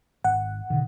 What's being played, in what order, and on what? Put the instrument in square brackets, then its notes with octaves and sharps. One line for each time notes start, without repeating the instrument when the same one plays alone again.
[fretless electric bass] G#1 [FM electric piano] F#5
[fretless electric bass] B2 D3 D#3